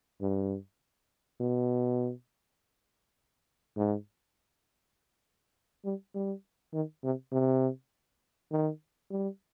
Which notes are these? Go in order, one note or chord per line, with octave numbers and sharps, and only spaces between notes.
G2
B2
G#2
G3
G3
D#3
C3
C3
D#3
G3